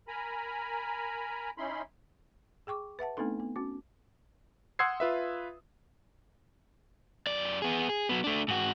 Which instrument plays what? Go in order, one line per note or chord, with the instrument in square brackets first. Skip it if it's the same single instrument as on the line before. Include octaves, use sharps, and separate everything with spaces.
[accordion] A#4 G#5 A#5 B5
C#4 D#4 E4 B5 C6
[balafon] G#4 G5 C#6 D6
B4 E5 F#5 A5
A3 B3 C4 D4 D#4 A4
B3
C#4 F#4
[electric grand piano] F#5 C6 D#6 E6 G#6 C7
F4 B4 E5
[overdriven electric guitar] F#2 D5
B3 G#4
G#4
F#3 B3
A3 D4
G#2 F#4